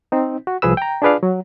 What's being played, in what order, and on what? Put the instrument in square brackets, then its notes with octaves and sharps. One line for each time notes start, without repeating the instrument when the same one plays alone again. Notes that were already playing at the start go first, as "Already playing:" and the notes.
[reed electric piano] C4 D#4
F#4
C2 F3 G#4 B4 E6
G5 A#5
D4 F4 G#4 B4 D5 F5
F#3